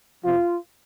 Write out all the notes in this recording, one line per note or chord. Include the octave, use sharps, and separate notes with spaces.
F2 C3 F3 F4